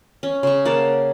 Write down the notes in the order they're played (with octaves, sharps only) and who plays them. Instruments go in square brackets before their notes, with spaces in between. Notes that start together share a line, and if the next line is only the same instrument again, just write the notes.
[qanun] C#4
C#3 C#6
A#3 F#5 A5